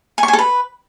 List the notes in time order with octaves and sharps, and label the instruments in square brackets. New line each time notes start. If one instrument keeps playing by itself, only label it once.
[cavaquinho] G#5
C#6
G#5
A4
B4